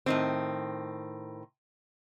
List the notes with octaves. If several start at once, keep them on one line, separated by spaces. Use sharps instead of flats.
A2 D#3 C4